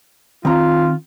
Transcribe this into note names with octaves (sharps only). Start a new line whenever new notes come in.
D#3 C4 F4 A#5